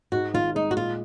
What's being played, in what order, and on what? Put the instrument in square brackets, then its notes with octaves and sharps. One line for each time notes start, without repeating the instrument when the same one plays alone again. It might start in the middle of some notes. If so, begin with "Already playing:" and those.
[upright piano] G#2 [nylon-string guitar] F#4
[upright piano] G#1 [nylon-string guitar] F4
[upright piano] G#3 [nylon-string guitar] D#4
[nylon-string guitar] F#4
[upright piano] A#2 [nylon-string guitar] F4